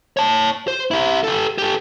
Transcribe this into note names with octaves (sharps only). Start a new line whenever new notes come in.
C#5 A5
C5
E4 G4
G4 A4
G4 A4